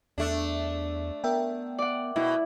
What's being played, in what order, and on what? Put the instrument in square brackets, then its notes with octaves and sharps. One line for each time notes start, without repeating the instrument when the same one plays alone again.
[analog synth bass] E2 [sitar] A3 D4
[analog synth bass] B3 [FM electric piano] A#4 E5 G5
[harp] D5 F#5
[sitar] B2 [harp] E4